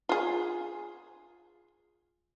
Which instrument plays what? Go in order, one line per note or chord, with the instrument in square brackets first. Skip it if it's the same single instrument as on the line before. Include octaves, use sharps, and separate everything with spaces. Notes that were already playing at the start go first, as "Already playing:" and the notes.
[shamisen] F4 G#4